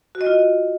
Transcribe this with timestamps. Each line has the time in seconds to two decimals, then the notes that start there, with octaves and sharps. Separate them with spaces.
0.15 F#4
0.21 D#5
0.26 F4